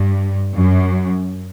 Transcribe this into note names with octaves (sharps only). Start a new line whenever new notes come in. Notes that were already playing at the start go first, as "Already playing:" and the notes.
Already playing: G2
F#2